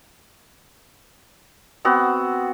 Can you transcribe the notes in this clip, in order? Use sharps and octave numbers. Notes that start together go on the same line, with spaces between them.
B3 C4 F#4